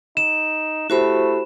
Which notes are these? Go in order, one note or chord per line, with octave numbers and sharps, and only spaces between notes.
D#4 E7
A3 E4 F#4 G4 C5 B5